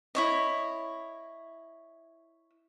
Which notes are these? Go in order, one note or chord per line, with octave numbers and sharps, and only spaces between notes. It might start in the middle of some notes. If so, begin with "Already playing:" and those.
E4 C#5 D#5